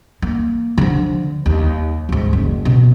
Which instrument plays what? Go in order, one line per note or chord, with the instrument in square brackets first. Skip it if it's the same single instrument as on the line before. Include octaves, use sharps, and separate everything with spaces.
[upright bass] A#3
D3 F3
D#2
D2 G#2
F#1
B2